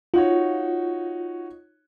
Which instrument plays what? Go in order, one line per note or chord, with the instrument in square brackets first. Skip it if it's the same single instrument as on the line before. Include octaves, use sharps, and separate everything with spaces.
[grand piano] D#4 F#4 C#5 [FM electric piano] F4